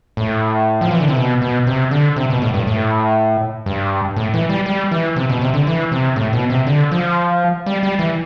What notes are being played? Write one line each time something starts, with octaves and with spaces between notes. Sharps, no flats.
A2
F3
E3
D3
C3
B2
B2
C3
D3
C3
B2
A2
G2
A2
G2
A2
E3
G3
G3
E3
C3
B2
C3
D3
E3
C3
A2
B2
C3
D3
F3
G3
G3
E3